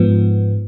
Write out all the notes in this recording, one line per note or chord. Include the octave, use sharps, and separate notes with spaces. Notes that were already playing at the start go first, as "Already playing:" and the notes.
Already playing: G#2 F3 B3